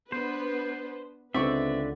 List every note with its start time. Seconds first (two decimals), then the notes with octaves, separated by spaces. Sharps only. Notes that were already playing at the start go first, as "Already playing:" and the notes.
0.12 B3 D4 B4 C5
1.34 C#2 D3 C4 B4 D5 E5 C#6